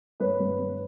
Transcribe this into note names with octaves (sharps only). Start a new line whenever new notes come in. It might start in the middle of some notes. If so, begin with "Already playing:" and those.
G2 B4 C#5
G2
G2